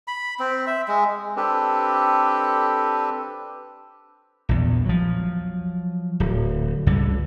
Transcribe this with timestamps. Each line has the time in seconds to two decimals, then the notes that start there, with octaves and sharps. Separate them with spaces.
0.08 B5
0.40 C4
0.67 E5
0.88 G#3
1.37 C4 D4 G4 A4 B4
4.49 A#1 E2
4.85 F3 F#3
6.20 D1
6.86 C#2 G2 D3